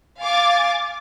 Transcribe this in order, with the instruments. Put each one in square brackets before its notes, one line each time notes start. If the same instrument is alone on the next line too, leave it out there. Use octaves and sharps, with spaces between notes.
[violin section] F5 G#5 D6 A6